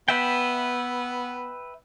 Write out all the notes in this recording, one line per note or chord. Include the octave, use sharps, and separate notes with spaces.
B3 B4 E5 G5